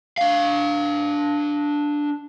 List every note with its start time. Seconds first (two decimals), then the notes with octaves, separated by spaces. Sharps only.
0.18 D4 F5